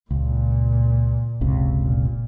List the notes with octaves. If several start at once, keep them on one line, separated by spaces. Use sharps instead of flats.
C#2 A#2
F#1 C#2 C3
A#2